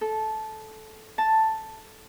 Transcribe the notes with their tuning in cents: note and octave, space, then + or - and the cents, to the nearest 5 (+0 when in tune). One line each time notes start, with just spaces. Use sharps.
A4 -15
A5 +5